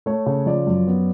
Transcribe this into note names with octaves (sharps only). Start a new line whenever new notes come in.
A3 C#5
C#3
F3 D5
F#2
B3